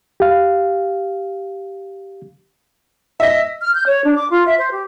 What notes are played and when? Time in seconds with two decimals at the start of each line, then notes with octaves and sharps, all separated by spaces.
0.20 G4 F5
3.20 D#5 E5 B6
3.61 F6
3.75 G6
3.87 C#5
4.02 D4
4.17 D6
4.30 F4
4.46 E5
4.58 C5
4.72 G4